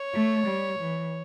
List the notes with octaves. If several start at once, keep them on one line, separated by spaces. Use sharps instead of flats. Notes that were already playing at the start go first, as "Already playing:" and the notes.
Already playing: C#5
A3
G3
E3